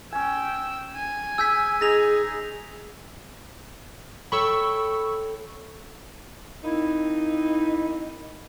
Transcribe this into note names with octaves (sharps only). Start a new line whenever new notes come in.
C#4 G5 G#5 E6
G#5
G#4 E6 G6 B6
D#4 G#4 A6 A#6 F7
A4 C#5 G5 B5 C#6 E6
A#3 C4 D#4 E4